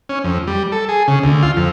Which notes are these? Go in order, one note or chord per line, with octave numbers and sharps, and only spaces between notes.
C#4
F2
G3
A4
G#4
C#3
D2
F4
F2